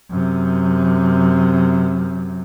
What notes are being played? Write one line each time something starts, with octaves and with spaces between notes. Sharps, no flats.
F#2 C3